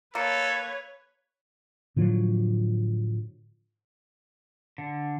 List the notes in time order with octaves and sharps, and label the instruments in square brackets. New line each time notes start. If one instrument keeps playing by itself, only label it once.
[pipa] A#3 [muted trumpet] A4 [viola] B4 C#5
[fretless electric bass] A2 D3 F3 F#3
[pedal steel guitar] D3